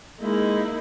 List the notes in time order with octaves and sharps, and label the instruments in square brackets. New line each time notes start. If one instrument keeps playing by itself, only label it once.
[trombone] G#3 [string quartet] A#3 D#4 E4